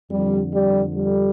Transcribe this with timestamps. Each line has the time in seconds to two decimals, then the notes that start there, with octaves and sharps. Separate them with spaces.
0.11 F2 D3 G3
0.53 G3
0.94 G3